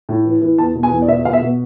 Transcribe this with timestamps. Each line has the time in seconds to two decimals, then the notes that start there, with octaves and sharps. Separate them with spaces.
0.09 A2
0.25 E3
0.41 E3
0.58 E2 A5
0.75 B2
0.83 G#5
0.91 E2
1.02 D5
1.08 B2 E5
1.25 B2 F5
1.33 E5
1.42 B2